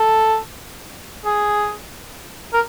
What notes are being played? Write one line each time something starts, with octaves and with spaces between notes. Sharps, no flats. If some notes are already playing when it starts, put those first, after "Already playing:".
Already playing: A4
G#4
A#4